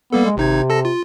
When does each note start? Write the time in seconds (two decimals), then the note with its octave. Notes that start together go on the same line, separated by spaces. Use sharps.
0.13 G3 A#3 B3 A4
0.25 G#3
0.37 G#1 C3 D#4 G#6
0.70 A4 A5 A#6
0.85 F4